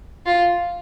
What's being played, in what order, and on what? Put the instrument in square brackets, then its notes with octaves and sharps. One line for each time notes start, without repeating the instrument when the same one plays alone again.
[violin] F4